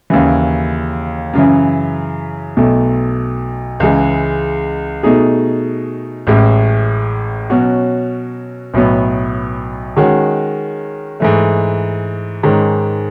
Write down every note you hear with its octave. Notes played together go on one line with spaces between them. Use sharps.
D#2 C#3 E3
F#2 C#3 E3
B1 B2 A3
C#2 C#3 E3 G#3
B2 A3 D#4 G#4
A1 A2 G#3
B2 F#3 C#4 F#4
B1 A2 F#3 B3
D#3 G#3 C#4 F#4
G#2 E3 A3
G#2 D#3 G#3 C#4